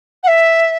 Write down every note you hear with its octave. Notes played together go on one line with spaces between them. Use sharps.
F#5
E5